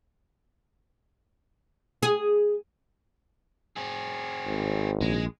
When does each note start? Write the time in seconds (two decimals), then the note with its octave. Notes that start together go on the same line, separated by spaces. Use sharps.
2.03 G#4
3.76 C4 G#4
4.46 G#1
5.01 A#1 G#3